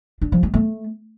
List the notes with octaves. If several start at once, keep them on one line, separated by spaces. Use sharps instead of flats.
D4
F3
G#3
A3